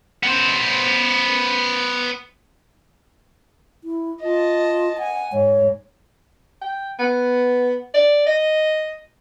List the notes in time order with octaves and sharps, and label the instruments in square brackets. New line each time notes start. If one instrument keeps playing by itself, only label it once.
[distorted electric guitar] B3 C5
[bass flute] E4
[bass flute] F4 [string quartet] D#5 A5
[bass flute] F#5 [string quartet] G#5
[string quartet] G#2 [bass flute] C#5
[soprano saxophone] G5
B3
D5
D#5